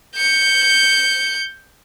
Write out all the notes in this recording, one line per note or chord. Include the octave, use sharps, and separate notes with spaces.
G6 C#7